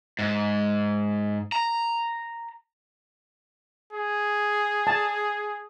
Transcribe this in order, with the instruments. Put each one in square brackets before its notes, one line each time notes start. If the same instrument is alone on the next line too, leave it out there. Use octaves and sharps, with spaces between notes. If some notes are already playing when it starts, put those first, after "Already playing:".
[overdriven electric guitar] G#2
A#5
[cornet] G#4
[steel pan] A5